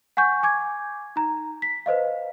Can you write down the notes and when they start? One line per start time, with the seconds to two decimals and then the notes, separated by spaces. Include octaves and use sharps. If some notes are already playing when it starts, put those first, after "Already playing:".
0.17 F#5 G#5 C#6 G6
0.43 G#5 D6 G#6
1.16 D#4 A#5
1.62 B6
1.86 B4 C5 D#5 F5